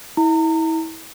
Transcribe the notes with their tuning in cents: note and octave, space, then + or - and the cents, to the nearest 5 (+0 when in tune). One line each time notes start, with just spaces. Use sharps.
E4 -30 A#5 -35